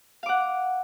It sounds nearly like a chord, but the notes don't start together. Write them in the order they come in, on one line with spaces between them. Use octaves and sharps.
F5 D6 F#5